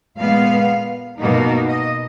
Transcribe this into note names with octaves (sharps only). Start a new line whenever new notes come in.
A#2 G#3 B3 F5
B2 A#3 D#4
D#5